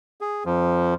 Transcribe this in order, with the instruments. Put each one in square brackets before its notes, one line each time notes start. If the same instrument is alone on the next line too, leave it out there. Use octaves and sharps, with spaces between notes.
[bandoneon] G#4
F2 F3